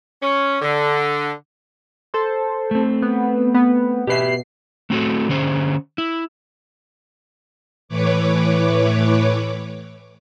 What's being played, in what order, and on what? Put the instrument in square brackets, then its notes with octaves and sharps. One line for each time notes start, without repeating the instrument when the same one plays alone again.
[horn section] C#4
D3
[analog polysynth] A4 C5
[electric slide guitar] A3 C4
[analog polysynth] B3
B3
[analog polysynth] B2 C7 [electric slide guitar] G4 B4 E5
[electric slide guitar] A3 C4 F#4 A4
D3 C#4 G#4 C5
E4
[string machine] A2 E3 B4 C#5 D6